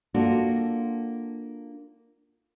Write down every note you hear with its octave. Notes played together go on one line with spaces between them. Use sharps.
A#3 D4 F4 F#4 A4